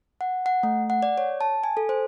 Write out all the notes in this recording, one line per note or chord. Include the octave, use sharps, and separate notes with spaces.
F#5
F#5
A3
F#5
D5
C#5
A5
G#5
A4
C5